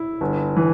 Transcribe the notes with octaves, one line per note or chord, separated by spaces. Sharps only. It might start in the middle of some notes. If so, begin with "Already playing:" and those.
Already playing: E4
G1
E3